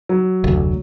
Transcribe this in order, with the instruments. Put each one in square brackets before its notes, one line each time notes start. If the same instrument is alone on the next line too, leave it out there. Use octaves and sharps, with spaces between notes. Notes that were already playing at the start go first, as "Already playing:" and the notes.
[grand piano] F#3
[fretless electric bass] F1 D2